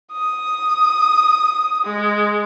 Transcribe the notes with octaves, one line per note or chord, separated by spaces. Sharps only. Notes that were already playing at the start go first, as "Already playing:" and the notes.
D#6
G#3